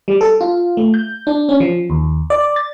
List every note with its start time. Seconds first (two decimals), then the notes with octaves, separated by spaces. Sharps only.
0.08 G3
0.21 A4
0.41 F4
0.77 A3
0.94 G6
1.27 D4
1.49 C#4
1.60 F3
1.90 D#2
2.30 D5
2.56 A6